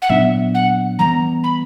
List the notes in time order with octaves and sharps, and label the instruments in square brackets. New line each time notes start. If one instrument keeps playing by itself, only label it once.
[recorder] F#5
[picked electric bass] A#2 F#3 B3 D4 [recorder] E5
[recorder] F#5
[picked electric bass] E3 G3 B3 [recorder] A#5
[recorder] B5